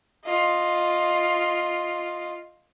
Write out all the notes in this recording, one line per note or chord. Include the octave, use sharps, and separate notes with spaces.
F4 D#5